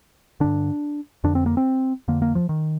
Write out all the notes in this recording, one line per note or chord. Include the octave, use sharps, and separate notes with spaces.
G2 D3 D4
F2 D3 D4
C4
A#3
C4
F2 D3 A#3
A#3
F3
D#3